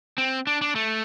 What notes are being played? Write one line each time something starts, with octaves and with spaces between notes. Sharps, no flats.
C4
D4
D4
A3